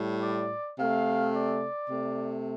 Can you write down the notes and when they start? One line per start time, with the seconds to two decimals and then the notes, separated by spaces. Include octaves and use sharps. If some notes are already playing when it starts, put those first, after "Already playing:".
Already playing: A2 G3
0.22 D5
0.78 C3 A3 F5
1.34 D5
1.90 C3 A3